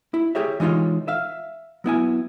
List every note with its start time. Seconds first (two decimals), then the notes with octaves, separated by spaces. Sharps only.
0.14 E4
0.35 G4 G#4 C#5 E5
0.60 E3 G#3 D#4 F4 C#5
1.08 E5 F5
1.84 F#3 B3 E4 G#5